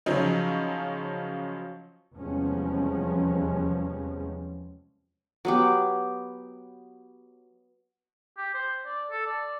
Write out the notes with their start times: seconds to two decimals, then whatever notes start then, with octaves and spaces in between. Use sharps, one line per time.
0.06 C#3 F3 F#3 C#4 D#4
2.15 E2 C3 F3 G3 G#3 C#4
5.45 F#3 B3 G4
8.38 G4
8.54 C5
8.86 D5
9.11 A4
9.27 D5